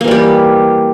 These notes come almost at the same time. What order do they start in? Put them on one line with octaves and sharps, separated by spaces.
A#3 E3 G3 G4